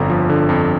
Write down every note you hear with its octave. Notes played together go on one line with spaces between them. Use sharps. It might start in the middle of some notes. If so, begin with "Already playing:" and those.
Already playing: G1 F2 D3 A#5
F3
D3
F2